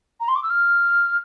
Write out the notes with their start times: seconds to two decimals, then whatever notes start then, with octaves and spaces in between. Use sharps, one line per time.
0.20 A#5
0.28 C6
0.36 D6
0.43 E6
0.50 F6